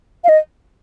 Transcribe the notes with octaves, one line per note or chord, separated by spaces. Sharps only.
F5
D#5